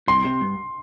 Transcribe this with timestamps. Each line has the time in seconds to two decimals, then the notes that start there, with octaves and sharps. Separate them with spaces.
0.08 C2 C6
0.25 C3
0.41 G2